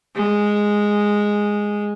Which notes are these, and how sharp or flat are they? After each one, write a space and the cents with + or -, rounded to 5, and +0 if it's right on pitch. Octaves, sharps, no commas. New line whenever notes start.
G#3 -5